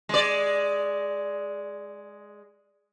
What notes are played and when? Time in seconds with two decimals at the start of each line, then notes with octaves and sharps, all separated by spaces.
0.09 G#3 D5